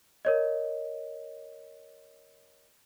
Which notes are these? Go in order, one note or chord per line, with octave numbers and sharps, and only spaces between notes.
A#4 C#5 D#5